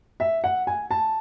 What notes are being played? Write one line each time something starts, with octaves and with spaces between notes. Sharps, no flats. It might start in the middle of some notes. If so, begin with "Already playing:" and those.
E5
F#5
G#5
A5